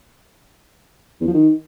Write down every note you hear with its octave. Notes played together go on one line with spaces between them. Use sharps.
E2
F3
D#3